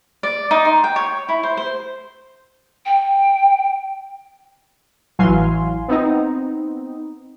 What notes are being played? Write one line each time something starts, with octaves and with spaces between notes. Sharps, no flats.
D5
D#4
C6
G5
C#5
E4
C5
C5
G5
A1 E3 F#3 F5 G#5 C6
B3 C4 D#4